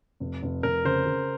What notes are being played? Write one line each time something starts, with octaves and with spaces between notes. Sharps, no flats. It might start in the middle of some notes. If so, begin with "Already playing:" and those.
F1
F1
F1 A#4
C#3 C5
C#3